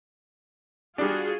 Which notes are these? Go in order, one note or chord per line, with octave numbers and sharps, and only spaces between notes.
G3 D4 F4 F#4 G#4